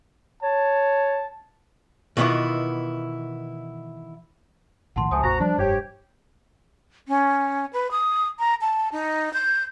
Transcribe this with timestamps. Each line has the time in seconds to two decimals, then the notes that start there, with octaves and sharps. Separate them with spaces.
0.43 C#5 A5
2.17 B2 D#3 E3 B3 E4 F4
4.96 A#1 A2 D#3 F#5 A5 C6
5.11 C#2 C3 F3 G#5 A5 D#6
5.24 A1 E2 F#4 C5 A#5
5.40 F3 G3 D4
5.58 F1 G2 G4 C#5
7.08 C#4
7.73 B4
7.91 D#6
8.39 A#5
8.61 A5
8.92 D#4
9.34 G6